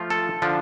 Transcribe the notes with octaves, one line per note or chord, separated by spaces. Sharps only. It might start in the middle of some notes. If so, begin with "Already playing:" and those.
Already playing: F3 A3 F4
A4
D3 F3 D4 F4